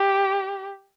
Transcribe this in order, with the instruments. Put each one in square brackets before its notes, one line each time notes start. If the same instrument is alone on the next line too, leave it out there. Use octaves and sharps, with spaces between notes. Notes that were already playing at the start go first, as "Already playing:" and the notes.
Already playing: [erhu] G4